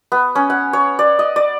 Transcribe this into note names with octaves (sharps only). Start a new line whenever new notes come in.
B3
C#4
F#5
C#5
D5
D#5
D5